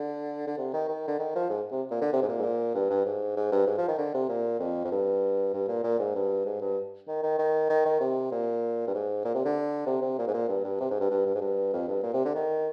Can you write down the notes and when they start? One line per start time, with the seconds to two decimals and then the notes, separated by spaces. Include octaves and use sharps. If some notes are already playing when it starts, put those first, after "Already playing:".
Already playing: D3
0.47 D3
0.58 C3
0.74 D#3
0.88 D#3
1.08 D3
1.19 D#3
1.36 F3
1.50 G#2
1.71 C3
1.91 A#2
2.01 D3
2.13 C3
2.22 G#2
2.28 A#2
2.39 G#2
2.43 A#2
2.74 G2
2.90 G2
3.06 G#2
3.37 G#2
3.52 G2
3.67 G#2
3.78 F3
3.88 D#3
3.99 D3
4.14 C3
4.29 A#2
4.60 F2
4.85 F2
4.92 G2
5.54 G2
5.68 A#2
5.84 A#2
6.00 G#2
6.15 G2
6.46 G#2
6.61 G2
7.08 D#3
7.23 D#3
7.39 D#3
7.70 D#3
7.86 D#3
8.01 C3
8.32 A#2
8.87 G2
8.94 G#2
9.25 A#2
9.35 C3
9.45 D3
9.87 C3
10.02 C3
10.18 A#2
10.28 G#2
10.34 A#2
10.49 G2
10.64 G2
10.80 C3
10.91 G#2
11.00 G2
11.11 G2
11.27 G2
11.35 G#2
11.41 G2
11.73 F2
11.88 G2
12.03 A#2
12.14 C3
12.25 D3
12.35 D#3